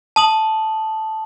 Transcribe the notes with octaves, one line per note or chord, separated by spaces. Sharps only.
A5 D#6 F#7